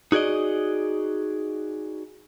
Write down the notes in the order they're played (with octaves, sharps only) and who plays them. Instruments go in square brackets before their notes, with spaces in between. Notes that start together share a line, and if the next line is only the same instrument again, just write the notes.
[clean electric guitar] D#4 F#4 G#4 D5 D#5